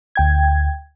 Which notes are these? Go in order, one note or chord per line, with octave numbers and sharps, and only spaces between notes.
D2 G5 G#6